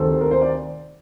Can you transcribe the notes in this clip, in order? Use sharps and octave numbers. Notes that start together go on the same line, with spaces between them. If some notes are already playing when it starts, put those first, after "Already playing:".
Already playing: D2 C3 D#3 A4 C5
A#4
C5
D5